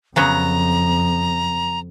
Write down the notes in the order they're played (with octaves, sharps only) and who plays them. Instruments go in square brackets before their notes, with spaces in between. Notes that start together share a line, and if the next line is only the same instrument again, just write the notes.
[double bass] F2 [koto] C#3 F#3 B3 [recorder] A#5